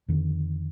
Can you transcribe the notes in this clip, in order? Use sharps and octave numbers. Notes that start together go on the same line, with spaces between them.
F2 D3 D#3